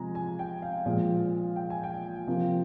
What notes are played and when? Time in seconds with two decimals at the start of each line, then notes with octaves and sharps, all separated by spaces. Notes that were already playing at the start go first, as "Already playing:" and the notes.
Already playing: C3 F3 G#3 G#5 A#5
0.15 G#5
0.39 G5
0.62 F5
0.86 A#2 F3 G#3
1.56 G5
1.70 G#5
1.84 G5
2.27 C3 F3 A#3